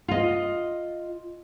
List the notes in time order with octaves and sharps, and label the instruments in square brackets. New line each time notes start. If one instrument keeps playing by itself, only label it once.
[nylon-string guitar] F4 D#5